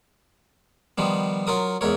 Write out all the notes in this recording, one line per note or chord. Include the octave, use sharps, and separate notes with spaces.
D#3 F3 G3 B3
F#3 F4 A#4 D#6
E2 G#2 A#4 C#5